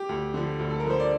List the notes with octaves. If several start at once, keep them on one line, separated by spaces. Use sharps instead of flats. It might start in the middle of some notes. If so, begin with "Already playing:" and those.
Already playing: G4
D2
D3 F3
D2
A4
A#4
D3 F3
C5
D5